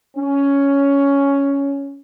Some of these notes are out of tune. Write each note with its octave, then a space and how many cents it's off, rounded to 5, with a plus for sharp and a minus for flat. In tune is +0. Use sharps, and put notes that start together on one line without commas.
C#4 +10